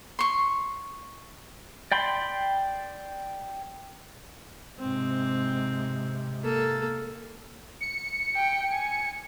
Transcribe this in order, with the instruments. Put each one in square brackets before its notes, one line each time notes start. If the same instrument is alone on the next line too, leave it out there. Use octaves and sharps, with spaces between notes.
[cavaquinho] C6 C#6
[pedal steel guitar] D5 G5 B5 C6
[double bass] G#2 C3 [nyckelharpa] C4
[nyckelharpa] A#3 A4
[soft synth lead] C#7
[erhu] G5
G#5